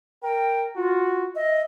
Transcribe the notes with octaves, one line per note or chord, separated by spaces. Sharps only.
A#4 G5
F4 F#4
D#5 E5